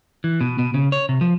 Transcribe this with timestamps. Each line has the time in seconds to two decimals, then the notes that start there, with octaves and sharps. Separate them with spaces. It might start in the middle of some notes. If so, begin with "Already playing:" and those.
0.24 E3
0.41 B2
0.59 B2
0.74 C#3
0.92 C#5
1.09 C3
1.21 F3